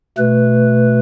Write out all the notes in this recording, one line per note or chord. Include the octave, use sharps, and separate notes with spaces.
B2 A3 B4